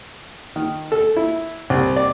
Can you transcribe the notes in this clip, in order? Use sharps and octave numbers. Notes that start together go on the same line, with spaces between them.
D#3
A4
E4
C2
D5